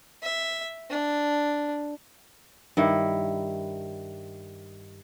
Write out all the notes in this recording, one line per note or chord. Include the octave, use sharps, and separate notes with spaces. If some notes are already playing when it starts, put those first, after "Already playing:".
E5
D4
G2 D#3 E4